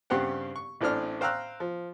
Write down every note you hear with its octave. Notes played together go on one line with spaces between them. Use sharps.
G2 C#3 C4 G4 F#5
C#6
A1 A2 C4 D4 F6
C5 F5 G5 A#5 E6 F#6
F3